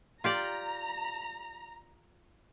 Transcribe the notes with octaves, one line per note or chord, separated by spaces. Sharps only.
F4 G4 D5 A#5